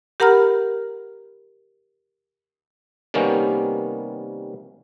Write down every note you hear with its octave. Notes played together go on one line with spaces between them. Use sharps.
G4 A#4 F#5 A#5 B5 F6
C3 D#3 G3 A#3 B3 C#4